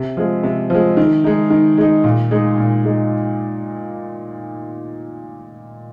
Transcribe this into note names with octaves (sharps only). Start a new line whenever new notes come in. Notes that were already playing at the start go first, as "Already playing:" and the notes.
Already playing: C3
F3 G#3
C3
F3 G#3
D#3
G#3 D#4
D#3
G#3 D#4
A#2
G#3 D#4
A#2
G#3 D#4